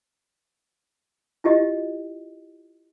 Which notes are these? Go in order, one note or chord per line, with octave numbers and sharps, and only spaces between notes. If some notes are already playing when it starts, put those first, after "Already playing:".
E4 F4 G4 D#5